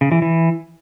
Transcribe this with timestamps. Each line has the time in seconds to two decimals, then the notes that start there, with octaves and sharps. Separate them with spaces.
0.01 C#3
0.12 E3
0.22 E3